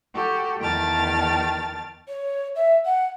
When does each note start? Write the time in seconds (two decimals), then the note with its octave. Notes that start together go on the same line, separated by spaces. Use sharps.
0.14 F#4 G4 A4
0.59 E2 D#3 G5 A5 F6 A6
2.08 C#5
2.56 E5
2.85 F#5